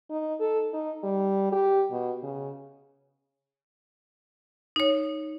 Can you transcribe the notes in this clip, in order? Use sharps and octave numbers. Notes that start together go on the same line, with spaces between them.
D#4
A4
D#4
G3
G4
B2
C#3
D#4 C#5